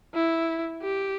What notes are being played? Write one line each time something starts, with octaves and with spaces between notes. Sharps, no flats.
E4
G4